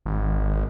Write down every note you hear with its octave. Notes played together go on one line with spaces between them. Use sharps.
G#1